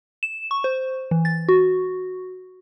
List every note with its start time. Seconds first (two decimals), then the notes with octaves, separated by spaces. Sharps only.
0.23 E7
0.51 C#6
0.64 C5
1.11 E3
1.25 A6
1.49 F#4